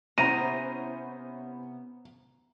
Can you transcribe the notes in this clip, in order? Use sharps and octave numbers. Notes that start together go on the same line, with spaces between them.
C3 B3 C#4 E4 C5 A#5 D#7